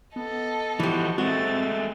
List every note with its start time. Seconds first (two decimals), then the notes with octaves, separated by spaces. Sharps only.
0.16 B3 A4 D#5
0.80 E3 F3 F#4 G4
1.18 G#3 A3 C4 F#4 A6